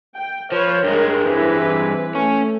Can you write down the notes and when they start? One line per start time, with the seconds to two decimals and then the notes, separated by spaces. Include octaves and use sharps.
0.16 G5
0.52 F3 B4 C#5
0.84 G2 G#3 A#4
1.24 E3 C4 B4
2.15 A3 C#4